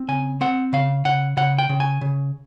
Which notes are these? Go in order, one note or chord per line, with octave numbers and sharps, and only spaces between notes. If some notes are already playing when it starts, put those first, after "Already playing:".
Already playing: C4
C#3 G#5
C4 F#5
C#3 F5
C#3 F#5
C#3 F#5
G5
C#3
G#5
C#3